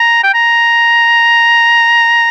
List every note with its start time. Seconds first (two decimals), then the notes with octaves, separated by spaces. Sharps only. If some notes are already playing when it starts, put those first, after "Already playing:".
Already playing: A#5
0.23 G5
0.34 A#5